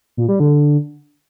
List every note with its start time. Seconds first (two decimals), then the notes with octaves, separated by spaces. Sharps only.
0.17 A#2
0.29 G3
0.40 D3